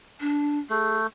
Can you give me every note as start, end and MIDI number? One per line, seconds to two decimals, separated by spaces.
0.20 0.59 62
0.70 1.07 57
0.70 0.98 68